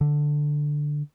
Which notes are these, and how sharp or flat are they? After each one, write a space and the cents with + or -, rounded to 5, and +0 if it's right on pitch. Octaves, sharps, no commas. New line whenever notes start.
D3 +5